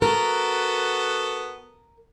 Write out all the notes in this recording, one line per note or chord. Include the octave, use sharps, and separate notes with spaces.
B3 F#4 A4 A#4